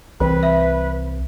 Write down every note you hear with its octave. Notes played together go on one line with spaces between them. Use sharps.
C2 E3 C4 B4
E5